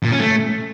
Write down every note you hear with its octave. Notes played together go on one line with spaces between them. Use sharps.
A#2
C#4
A3